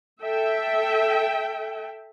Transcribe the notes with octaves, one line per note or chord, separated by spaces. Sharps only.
A4 E5 G5